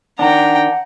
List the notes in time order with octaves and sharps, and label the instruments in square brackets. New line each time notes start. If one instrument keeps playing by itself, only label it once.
[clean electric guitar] D#3 D4 [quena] F#5 [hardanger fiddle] G5 A#5